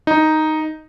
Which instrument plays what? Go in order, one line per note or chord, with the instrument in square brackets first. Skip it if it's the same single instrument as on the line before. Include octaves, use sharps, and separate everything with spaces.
[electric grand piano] D#4